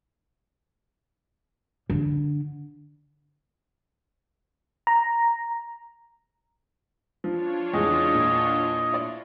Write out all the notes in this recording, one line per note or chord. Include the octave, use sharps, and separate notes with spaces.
D3
A#5
F3 D4 F4 C#5
E2 C#3 G#3 D#5
A#2
E4 D5